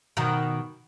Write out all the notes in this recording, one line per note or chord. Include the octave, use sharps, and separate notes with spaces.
B2 D#3